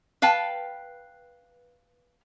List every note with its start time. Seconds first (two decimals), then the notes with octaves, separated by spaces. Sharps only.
0.22 B4 F5 G5 A5